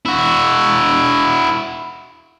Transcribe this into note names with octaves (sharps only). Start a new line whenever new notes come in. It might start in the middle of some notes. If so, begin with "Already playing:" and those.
E4 F#4